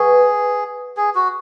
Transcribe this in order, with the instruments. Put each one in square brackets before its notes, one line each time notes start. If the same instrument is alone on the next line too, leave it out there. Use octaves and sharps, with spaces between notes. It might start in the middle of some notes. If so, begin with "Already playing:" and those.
Already playing: [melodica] G#4 [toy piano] B4 F#5 C#6
[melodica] G#4
F#4